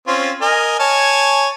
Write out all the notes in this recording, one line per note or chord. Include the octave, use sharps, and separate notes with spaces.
C4 C#4 F4
A#4 D#5 G#5
C#5 G#5 A5